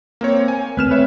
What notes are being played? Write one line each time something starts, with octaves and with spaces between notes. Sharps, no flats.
A#3 C4 C#5
G#5
A3 C4 B4 F6 E7
B4 C#5 E5